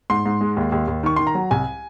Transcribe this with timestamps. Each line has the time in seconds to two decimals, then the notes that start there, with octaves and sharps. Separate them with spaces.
0.10 G#2 C6
0.26 G#2
0.41 G#3
0.57 D#2
0.72 D#2
0.88 D#2
1.03 D#3 C#6
1.16 D#3 C6
1.27 A#5
1.35 F#3
1.51 C2 G#5